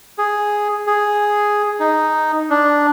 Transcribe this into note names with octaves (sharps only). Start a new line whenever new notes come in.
G#4
G#4
D#4
D4